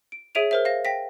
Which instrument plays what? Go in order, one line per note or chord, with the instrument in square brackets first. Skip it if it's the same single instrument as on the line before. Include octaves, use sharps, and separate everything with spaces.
[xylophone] D7
G#4 C#5 E5 D7 D#7 F7
A#4 C5 E5
F5 A#6
G5 A#6 B6